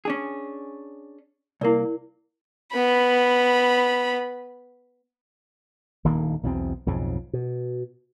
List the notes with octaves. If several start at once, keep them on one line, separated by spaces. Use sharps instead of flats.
C#4 D4 G#4
C2 A#3 E4 A#4 D5
B3 B5
D#1 D2 D#3 A#3
B1 E2 B2 C4
B1 F2 G#2 C#3
B2